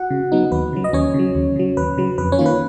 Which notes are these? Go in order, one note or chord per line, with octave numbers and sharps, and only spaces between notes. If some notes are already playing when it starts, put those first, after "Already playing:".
Already playing: F#4 F#5
C#3
F#3 B3 D#4
D#2 B4
C#3 F#3
D#5
D#2 C#4 C#5
C#3
F#3
D#2
C#3 F#3
D#2 B4
C#3 F#3
F2 B4
C#4 C#5
D#3 A#3 F4
B4